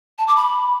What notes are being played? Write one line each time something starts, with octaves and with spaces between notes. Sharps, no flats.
A5
D6
B5